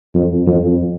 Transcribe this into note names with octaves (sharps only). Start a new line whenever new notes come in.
F2
F2